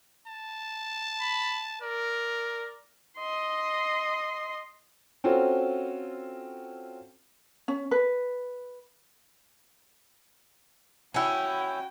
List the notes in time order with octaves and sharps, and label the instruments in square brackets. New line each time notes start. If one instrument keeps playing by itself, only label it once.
[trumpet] A5
[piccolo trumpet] B5
[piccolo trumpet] A#4 [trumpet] D5
[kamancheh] D#5 C6
[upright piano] C4 C#4 F4 F#4 A4 C5
[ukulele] C#4
B4
[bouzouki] C#4 E4 [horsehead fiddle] F#4 G5